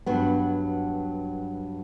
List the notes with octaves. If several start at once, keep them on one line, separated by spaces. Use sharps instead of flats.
G2 F#3 B3